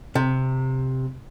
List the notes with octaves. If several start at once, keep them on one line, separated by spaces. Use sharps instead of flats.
C3